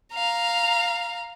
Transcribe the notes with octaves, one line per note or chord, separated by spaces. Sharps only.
F5 A#5